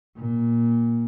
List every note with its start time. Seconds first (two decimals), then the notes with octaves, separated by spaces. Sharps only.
0.17 A#2